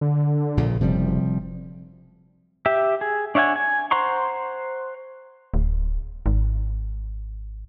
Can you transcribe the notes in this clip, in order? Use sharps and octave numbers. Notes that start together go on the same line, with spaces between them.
D3
A#1 A#2 C#3
F#1 C3 F3 G3
G4 E5
G#4
D4 C#5 E5 F#5 G#5
G#5
C5 F#5 A#5 C6 C#6
D1
G#1